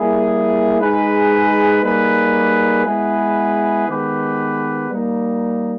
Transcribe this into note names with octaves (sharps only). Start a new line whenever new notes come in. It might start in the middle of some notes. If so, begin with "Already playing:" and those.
Already playing: G3 A#3 E4 G#4
G#3 D#4 G#4 B4
G3 A#3 D#4 G#4 B4
G#3 B3 E4 G#4 B4
D#3 G#3 B3 G4 B4
G3 A#3 D#4